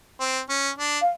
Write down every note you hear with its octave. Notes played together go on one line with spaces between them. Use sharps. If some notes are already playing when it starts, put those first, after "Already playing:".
C4
C#4
D4
F5